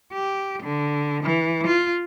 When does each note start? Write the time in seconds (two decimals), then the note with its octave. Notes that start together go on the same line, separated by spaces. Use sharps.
0.13 G4
0.63 D3
1.23 E3
1.67 F4